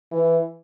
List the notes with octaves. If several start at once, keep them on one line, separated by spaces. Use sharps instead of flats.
E3